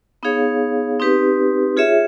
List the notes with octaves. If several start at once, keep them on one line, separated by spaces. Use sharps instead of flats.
B3 D#4 G#4 C#5 F5
C4 D#4 G4 B4
F4 G#4 C#5 E5